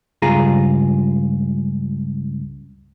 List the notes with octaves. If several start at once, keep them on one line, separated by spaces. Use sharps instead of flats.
C#2 G2 F4 G#4 A#5